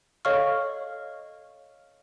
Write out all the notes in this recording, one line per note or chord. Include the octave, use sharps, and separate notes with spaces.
A4 C#5 D#5 F5 C#6 F6